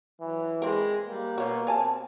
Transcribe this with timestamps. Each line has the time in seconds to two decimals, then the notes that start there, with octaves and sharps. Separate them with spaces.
0.21 E3 F#3
0.62 G#3 C4 A#4
1.08 G3 A#3
1.38 B2 F#4 C#5
1.67 C4 C#5 G#5 A5